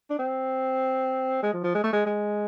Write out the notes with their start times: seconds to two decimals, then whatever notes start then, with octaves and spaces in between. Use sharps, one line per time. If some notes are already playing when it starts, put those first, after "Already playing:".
0.10 D4
0.19 C4
1.43 G#3
1.54 F3
1.64 F3
1.75 G#3
1.84 A3
1.93 G#3
2.06 G#3